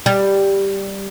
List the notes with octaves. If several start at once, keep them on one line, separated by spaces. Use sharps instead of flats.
G3